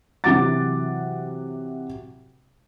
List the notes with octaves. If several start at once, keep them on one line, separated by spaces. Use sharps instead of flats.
C3 E3 F#3 F#5 D6 A6